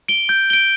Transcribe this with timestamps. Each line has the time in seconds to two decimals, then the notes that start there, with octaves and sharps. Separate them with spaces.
0.08 D7 G7
0.29 G6
0.50 D7 G7